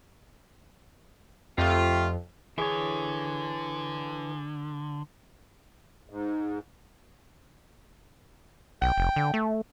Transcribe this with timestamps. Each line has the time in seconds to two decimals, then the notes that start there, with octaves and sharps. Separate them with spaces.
1.58 F2 A3 F4 G4
2.58 D3 E3 G#4 C#5
6.09 G#2
8.82 B1 G5
8.98 F1
9.16 D3
9.34 A3